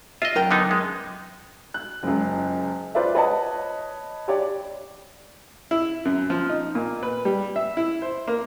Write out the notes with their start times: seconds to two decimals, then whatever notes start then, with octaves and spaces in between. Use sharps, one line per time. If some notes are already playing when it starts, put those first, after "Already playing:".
0.22 F4 D#5 E5
0.35 F#2 A#4 G5
0.51 D3 B3 D#4
0.71 G#3
1.74 F#6
2.03 F#1 C#2
2.95 F4 B4 C5 D5 E5
3.15 B4 C#5 D#5 F#5 A5
4.28 G4 C#5 D5
5.71 E4
6.05 F#2
6.30 F3
6.49 D#4
6.75 A#2
7.03 B4
7.25 G3
7.56 E5
7.77 E4
8.02 C5
8.28 A#3